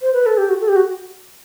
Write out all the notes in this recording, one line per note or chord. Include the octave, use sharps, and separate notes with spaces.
C5
B4
A4
G4
F#4
A4
G4
F#4